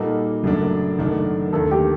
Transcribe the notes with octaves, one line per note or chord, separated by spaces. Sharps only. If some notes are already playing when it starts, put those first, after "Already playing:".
Already playing: A#2 G3 A#3 D#4 F#4 A4
F#1 F#2 F#3 A3 D4
F#1 F#2 D#3 A3 D4
D#2 D3 A3 A4
G4